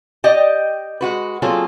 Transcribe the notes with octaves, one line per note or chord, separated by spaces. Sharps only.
G4 D5 D#5 G5
G#3 F#4 B4
F#3 A#3 C4 F4 G#4 A4